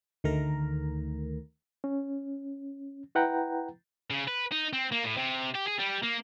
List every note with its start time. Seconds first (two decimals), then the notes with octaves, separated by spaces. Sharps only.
0.24 D2 D#3 A3 A#4 A#5
1.84 C#4
3.15 E4 B4 F#5 G5 A#5
4.11 C#3
4.28 B4
4.52 D#4
4.73 C4
4.92 A#3
5.04 A2
5.17 C3
5.55 G4
5.68 G#4
5.80 G3
6.03 A#3